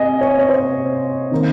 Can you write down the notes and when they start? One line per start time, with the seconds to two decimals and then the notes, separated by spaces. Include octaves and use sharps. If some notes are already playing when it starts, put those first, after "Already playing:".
Already playing: C3 D#5 G#5
0.21 C#5
0.39 C#5
0.49 C5
1.31 D#3 A#3